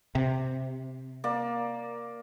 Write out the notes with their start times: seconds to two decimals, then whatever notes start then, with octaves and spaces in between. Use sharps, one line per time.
0.15 C3
1.24 A#3 D5